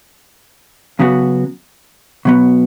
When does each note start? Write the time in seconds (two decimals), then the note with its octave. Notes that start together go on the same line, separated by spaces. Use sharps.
1.00 C#3 F#3 B3 F#4
2.25 B2 F#3 B3